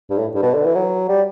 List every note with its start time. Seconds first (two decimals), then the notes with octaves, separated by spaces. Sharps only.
0.10 G2
0.18 A2
0.35 G2
0.43 B2
0.54 D3
0.65 E3
0.75 F#3
1.09 G3